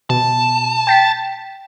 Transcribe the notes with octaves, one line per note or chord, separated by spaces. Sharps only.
B2 A5
G5 A6 B6